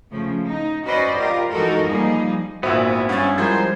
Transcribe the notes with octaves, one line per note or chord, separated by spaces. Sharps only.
C#3 F3 A3
D#4
C#4 F#4 B4 C5 D5 D#5
F4 G4 A#4
E3 G#3 D#4 F#4 A4 A#4
F3 G3 A#3 D#4 G#4
G#1 A#2 B3 E4 F#4 C5 E5
G2 C#4 F#5 A6
F3 G3 G#3 E4 A#4 C5 G#6